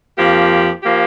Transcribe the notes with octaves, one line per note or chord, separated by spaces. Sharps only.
F2 F3 A#3 G4
F3 A#3 G4